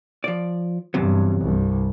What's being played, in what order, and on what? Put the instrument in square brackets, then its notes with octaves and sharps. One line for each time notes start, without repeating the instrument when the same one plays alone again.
[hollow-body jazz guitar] F3 D5
[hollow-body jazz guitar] E2 C3 F#3 [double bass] G2
[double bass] C2 G2